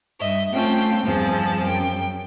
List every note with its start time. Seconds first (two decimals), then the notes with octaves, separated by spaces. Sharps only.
0.20 G2 D#5 E5
0.52 A3 C4 C#4 F4 G5 A5
1.04 E2 G2 F3 C4 G#4 A5
1.63 F#2 G5